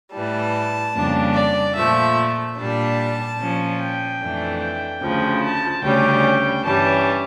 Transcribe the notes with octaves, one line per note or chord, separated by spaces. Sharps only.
A2 E3 G3 A5
F2 C#3 G3 A#3 D4
D5
A#2 F3 A3 E5
A#2 G3 D4 A5
A#2 F3 C#4
G5
F2 E3 A3 D4
G5
D2 C#3 F3
A5
D2 C#3 G3 C#4 G5
G2 E3 G3 C#4 A5